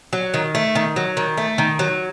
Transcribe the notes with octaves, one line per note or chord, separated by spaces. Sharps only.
F#3
D#3
A3
D#3
F#3
D#3
A3
D#3
F#3